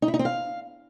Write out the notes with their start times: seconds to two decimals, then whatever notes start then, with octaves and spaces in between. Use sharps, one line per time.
0.02 D#4
0.08 E4
0.14 D#4
0.19 C4
0.25 F5